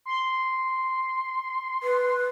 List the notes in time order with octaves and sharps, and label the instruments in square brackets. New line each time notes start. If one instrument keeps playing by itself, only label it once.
[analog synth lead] C6
[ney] B4